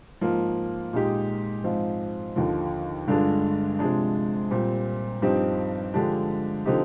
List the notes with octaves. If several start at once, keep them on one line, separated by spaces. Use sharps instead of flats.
G#2 F3 A#3
A#2 G#3 D#4 G4
G#2 F3 C4 F4
D#2 D3 F3
G2 D3 G#3 D4 F4
C3 F3 G#3 D4
A#2 G3 C4 G4
G2 F3 C4 D#4 G4
D3 F3 G#3 D4 G4
D3 F3 C4 D#4 G4